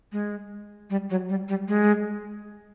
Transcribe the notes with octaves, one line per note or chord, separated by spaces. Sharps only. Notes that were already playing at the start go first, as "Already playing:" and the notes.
G#3
G3
F#3
G3
G3
G#3